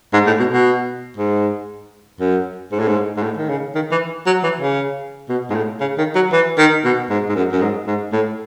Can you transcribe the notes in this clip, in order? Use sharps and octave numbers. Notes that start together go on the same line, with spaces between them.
G#2
A2
B2
B2
G#2
F#2
G#2
A2
G#2
G#2
A2
D#3
C#3
D#3
E3
F#3
E3
C#3
B2
G#2
A2
C#3
D#3
F#3
E3
D#3
B2
G#2
G#2
F#2
F#2
G#2
G#2
A2